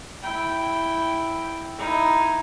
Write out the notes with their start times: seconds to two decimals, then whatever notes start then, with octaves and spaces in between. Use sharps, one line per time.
0.22 E4 G5
1.78 D#4 E4